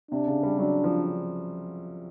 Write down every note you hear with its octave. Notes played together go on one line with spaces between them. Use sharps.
C3 D4
C#3
G3
F#3 D4
F3